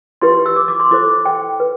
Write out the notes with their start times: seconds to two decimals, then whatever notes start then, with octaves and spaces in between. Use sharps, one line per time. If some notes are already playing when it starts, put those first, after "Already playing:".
0.22 E4 G4 B4 C6
0.46 E6
0.56 D6
0.68 D6
0.80 C6
0.91 E4 A4 C5 D6
1.25 G5
1.60 B4